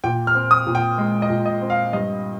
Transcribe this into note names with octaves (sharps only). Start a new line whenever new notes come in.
A#2 G5
F6
C4
D#6
A#2
G5
G#3
D#5
A#2
D#5
C4
F5
G2 D#5